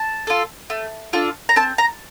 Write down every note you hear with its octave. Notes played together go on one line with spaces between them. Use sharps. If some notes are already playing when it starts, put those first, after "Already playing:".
Already playing: A5
F4 A4
A3
D4 F4 A4
A#5
C4 A5
A#5